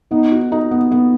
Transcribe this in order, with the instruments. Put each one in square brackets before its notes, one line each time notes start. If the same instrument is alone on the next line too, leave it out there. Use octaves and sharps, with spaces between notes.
[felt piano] B3 [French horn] D#4
[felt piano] F#4
D#4
B3
B3